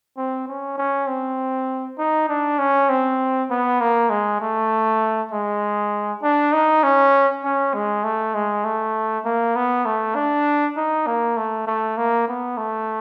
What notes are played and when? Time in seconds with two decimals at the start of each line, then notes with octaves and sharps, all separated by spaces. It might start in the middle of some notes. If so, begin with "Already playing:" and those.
0.17 C4
0.48 C#4
0.78 C#4
1.07 C4
1.98 D#4
2.29 D4
2.59 C#4
2.89 C4
3.51 B3
3.81 A#3
4.10 G#3
4.41 A3
5.32 G#3
6.23 D4
6.53 D#4
6.83 C#4
7.44 C#4
7.74 G#3
8.04 A3
8.34 G#3
8.65 A3
9.25 A#3
9.56 B3
9.85 A3
10.15 D4
10.77 D#4
11.07 A#3
11.37 A3
11.67 A3
11.97 A#3
12.28 B3
12.57 A3